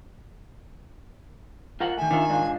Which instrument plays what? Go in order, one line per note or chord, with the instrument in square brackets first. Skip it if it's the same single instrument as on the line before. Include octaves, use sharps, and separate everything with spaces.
[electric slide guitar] F4 A#4 F#5
[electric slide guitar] D#3 A3 [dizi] G#5
[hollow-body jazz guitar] D#3 [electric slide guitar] D4 F4 E5
[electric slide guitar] G#2 D4 F4